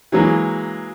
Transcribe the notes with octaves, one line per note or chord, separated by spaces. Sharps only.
E3 F#3 G#3 A#3